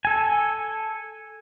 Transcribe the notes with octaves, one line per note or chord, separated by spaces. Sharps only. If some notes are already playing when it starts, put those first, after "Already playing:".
A4 G#5